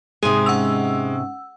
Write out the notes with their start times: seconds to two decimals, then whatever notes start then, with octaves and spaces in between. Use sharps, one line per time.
0.23 G#2 C3 G#3 G#4 C6 D#6
0.46 C#4 F#5 E6